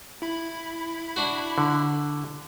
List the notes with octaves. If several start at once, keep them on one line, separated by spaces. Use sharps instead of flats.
E4 B5
D4 F#4
D3